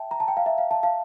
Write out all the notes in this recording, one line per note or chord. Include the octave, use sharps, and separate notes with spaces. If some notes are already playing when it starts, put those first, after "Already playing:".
Already playing: E5 G5 A5
A#5
A5
G5
F5
E5
F5
F5 A5
F5 A5